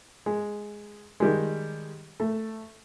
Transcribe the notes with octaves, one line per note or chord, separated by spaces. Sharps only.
G#3
D#3 G3 G#3
A3